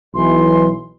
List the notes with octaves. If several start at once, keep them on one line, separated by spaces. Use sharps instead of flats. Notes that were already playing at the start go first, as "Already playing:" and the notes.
B1 E3 C6